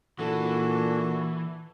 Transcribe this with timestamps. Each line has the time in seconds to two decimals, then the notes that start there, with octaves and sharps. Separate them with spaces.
0.19 A#2 E3 D4 F#4 A4